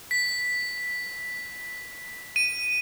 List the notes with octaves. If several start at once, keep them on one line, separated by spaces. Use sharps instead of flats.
B6
D#7